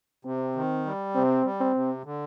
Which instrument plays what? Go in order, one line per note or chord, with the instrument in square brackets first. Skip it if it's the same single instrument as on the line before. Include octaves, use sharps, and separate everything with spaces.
[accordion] C3 [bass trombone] C4
[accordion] D#3
G3
[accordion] C3 [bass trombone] C4
[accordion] G3
[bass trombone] C4
[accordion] C3
D3